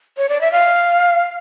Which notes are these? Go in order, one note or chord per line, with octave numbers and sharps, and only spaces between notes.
C#5
D5
E5
F5